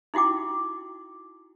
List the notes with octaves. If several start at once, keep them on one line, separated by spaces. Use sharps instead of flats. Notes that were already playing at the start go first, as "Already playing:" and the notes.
D#4 E4 F#4 G5 D6